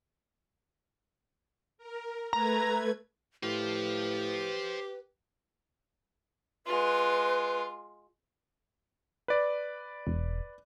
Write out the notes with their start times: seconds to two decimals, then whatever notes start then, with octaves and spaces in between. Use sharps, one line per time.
1.78 A#4
2.33 A3 B4 A#5 G#6
3.43 A2 G4 B4 C5 F5
6.67 G#3 F4 B4
9.28 B4 D5
10.07 E1